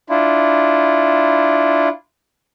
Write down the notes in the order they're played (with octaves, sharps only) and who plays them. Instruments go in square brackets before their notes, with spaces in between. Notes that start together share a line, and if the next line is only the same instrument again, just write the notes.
[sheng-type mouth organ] D4 E4 F4